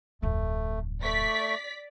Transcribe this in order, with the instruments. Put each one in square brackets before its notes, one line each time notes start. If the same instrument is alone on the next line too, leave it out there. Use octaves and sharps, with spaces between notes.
[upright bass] D1 F2 [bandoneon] A3
[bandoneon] A3 C#6 [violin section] D5 B6